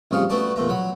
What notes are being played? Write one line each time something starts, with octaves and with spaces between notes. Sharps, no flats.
A1 F2 G3 G#4 F5 C#6
A3 B3 F#4 B4 D5 A5
E2 A#2 A3 A#5
F#3 F#5 B5